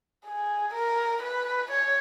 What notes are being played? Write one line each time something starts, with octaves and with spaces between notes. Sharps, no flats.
G#4
A#4
B4
C#5